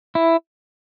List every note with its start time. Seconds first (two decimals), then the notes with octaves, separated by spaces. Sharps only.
0.15 E4